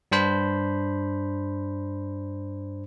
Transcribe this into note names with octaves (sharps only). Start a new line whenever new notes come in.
G2 D4 C5 B5